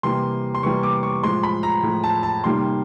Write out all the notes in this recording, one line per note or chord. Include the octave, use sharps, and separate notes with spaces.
C3 E3 G3 A#3 C6
C6
C3 E3 G3 A#3 C#6
D6
C#6
A2 F3 G#3 C6
B5
A#5
A2 F3 G#3
A5
A5
C3 D#3 G3 A#3 C6